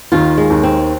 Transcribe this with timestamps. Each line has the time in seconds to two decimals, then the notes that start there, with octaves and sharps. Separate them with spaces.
0.12 D#2 D#3 F4
0.37 G#3
0.50 D#2 D#3
0.63 C4